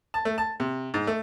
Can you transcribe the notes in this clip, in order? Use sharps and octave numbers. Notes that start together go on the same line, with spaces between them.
A5
A3
A5
C3
G#2
A3